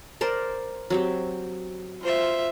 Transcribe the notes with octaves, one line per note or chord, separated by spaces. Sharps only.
A#4 C5 D5
F#3 C4 G4
F4 C5 E5